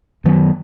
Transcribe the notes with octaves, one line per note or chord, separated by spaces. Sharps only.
F#2 D#3 F#3 B3